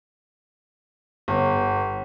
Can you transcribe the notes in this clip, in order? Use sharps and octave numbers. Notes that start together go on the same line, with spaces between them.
G1